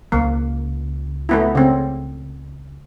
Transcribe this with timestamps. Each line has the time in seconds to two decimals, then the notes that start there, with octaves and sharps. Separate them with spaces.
0.12 C#2 A#3
1.29 A3 B3 E4
1.55 C#3 C4